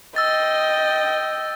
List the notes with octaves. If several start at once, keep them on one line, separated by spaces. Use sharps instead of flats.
D#5 G5 E6 A6